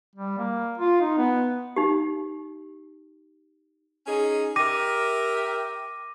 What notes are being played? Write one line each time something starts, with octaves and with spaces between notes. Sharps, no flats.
G3
A#3
F4
D#4
B3
D#4 G4
C#4 D#4 G#4
G4 A#4 E5 D6 A#6 D#7